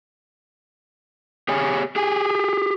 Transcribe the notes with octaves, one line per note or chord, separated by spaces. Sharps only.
G4 G#4 C#5 G#5
G4 G#4 G#5